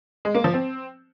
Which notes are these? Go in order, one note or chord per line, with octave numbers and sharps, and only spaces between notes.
G#3
A#3
F3
C4